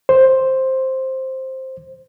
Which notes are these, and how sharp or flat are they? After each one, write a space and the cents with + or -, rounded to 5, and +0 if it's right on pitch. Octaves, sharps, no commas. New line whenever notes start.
C5 +5